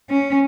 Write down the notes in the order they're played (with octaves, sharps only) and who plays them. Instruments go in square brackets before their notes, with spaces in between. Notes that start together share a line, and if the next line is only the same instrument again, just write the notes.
[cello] C#4